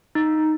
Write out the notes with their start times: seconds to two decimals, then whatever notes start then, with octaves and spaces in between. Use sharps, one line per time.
0.15 D#4